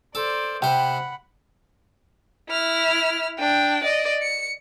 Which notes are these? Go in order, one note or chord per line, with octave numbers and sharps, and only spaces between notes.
A4 C5 D5
C3 C5 F#5 G5 B5
E4 F6
D4 G5
D5 D#5
C#7